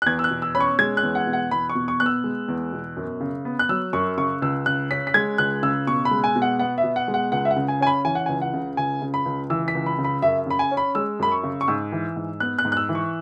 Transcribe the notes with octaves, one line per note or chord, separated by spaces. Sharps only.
F#6
E2 G#6
E6
F#6
B2
E6
C#4 B5
C#6
G#3 G#6
F#6
E2
F#5
B2
F#5
E2 B5
C#6
B2
C#6
B3 F#6
E6
G#3
E2
B2
F#2
C#3
B3
F#6
F#3 E6
F#2 C#6
C#3 C#6
C#2 E6
C#3 F#6
C#4 B6
B6
G#3 G#6
C#2 F#6
C#3 E6
B2 C#6
B5
G#3
G#5
B2
F#5
B3 F#5
E5
B2
F#5
G#3
F#5
C#2 F#5
E5
F#5
C#3
G#5
C#4 G#5
B5
E3 G#5
F#5
C#2 G#5
F#5
C#3
C#2 G#5
C#3
B5
C#2
E3 E6
B6
C#2
B5
C#3
B5
F#2 E5
C#3 B5
G#5
C#4
B5
G#3 E6
F#2 B5
C#6
C#3
C#6
G#2 E6
E3
G#2
B3 F#6
F#6
G#2
F#6
E6
E3
C#6